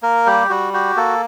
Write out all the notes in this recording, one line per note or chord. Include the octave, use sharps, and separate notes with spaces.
A#3 A#4
G3 G4
G3 F#4
F#4 G4
A#3 A4